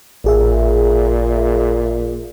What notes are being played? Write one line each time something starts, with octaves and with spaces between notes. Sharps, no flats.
A1 A#2 G#4 E5